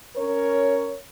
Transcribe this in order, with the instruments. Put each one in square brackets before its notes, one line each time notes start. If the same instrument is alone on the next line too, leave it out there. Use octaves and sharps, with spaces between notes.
[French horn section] C#4 A#4 C#5